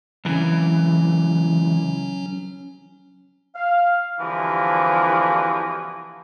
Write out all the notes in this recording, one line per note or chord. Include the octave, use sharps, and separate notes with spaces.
C#2 E3 F#3 C#4
F5
C2 D3 E3 F3 A#3 F#4